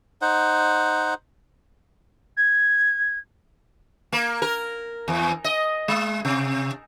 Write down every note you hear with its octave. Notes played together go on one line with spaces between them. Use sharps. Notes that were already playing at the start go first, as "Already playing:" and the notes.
D#4 C5 F#5
G#6
A#3
A#4
E2
D#5
G#3
C3